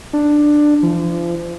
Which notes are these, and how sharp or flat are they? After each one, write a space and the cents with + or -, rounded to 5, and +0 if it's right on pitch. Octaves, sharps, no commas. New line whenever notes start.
D4 +10
F3 -35